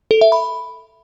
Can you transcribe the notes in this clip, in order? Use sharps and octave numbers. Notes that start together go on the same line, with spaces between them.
A4
E5
B5